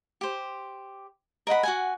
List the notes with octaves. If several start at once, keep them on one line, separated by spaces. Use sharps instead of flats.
G4 C5
A#4 D#5 F#5 B5
F#4 F#5 G#5